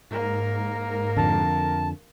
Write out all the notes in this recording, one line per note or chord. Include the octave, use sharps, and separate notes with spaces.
G#2 A#3 A#4
F2 D3 A5